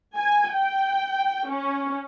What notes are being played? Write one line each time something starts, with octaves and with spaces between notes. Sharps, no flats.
G#5
G5
C#4